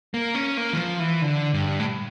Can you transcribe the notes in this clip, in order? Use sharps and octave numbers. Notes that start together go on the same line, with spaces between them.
A#3
C#4
A#3
E3
F3
E3
D3
G2
A2